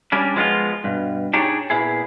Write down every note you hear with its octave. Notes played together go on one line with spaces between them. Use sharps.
G3 C#4 D4
F3 G#3 B3 E4 F4
G2 B2
D4 D#4 G4 G#4 C#5 D5
A#2 B3 E4 G#4